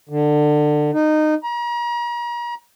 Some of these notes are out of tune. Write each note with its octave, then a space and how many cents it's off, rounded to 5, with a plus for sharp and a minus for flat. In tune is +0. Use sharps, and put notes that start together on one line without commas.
D3 +25
D#4 -20
A#5 +40